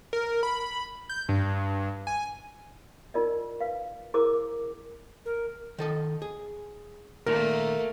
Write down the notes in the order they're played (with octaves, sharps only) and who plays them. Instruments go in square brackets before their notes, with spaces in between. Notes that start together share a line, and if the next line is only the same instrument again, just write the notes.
[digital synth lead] A#4
B5
G6
G2
G#5
[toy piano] D#4 F4 A#4 D5 D#5
B4 F5
E4 G#4 A#4 C5 D6
[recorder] A#4
[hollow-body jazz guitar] D#3 A4 D#5
G#4
[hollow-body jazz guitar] A#2 D#3 [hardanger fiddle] A3 A#3 [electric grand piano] A#4